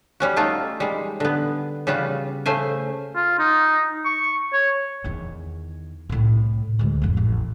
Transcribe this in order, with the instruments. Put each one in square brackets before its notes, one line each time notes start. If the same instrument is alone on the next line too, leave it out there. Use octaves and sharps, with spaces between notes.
[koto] G3 C#4 F#4
A3 D#4 F4 F#4 A4
G3 G#3
D3 B3
C#3 G3 F4 F#4
C#3 A3 C5 G#5
[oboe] F4
D#4
C#6
C#5
[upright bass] E2 D#3
C2 A2
D2 G#3
A1 F2
A1